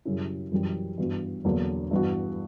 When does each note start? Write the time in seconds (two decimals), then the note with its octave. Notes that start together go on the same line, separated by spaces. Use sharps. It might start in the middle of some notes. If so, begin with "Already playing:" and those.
0.05 F#2 C#3 G3 C#4 E4
0.52 F#2 E3 G3
0.98 G2 E3 B3 F#4
1.45 E2 D3 F#3 A#3 D4
1.91 G2 E3 B3 F#4